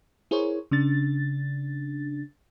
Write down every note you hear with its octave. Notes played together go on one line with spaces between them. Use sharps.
E4 G#4 A#4 C5 C#5
C#3 D4 A6